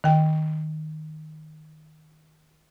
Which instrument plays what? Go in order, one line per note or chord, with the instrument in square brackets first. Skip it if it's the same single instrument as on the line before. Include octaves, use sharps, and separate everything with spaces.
[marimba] D#3 G5